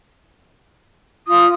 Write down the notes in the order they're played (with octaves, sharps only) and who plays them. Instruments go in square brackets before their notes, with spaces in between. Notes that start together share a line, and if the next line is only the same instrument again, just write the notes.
[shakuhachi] F4 [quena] D#6